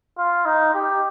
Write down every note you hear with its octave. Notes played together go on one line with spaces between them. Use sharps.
F4
D#4
G4